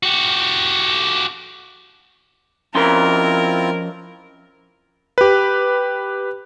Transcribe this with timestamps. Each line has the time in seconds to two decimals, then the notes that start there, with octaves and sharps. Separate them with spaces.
0.03 F#4 G4
2.75 F3 C4 C#4 E4 F4 A#4 C6
5.18 G4 B4